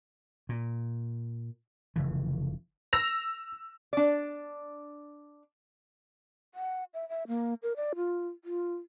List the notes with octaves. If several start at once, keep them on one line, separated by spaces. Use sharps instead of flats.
A#2
F1 C#3 E3
E6 A#6 F7
D4 D5
F#5
E5
E5
A#3
A#4
D5
F4
F4